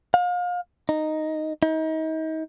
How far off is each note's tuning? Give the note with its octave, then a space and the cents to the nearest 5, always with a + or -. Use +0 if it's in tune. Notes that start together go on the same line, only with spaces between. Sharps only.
F5 +35
D#4 -5
D#4 +35